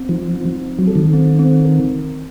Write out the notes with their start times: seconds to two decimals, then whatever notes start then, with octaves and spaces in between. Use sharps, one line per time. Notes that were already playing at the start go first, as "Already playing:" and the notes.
Already playing: C4
0.09 F3 D#4
0.36 C4
0.61 C4
0.79 F#3
0.87 A4
0.95 D#3
1.13 C4
1.39 C4
1.65 A#4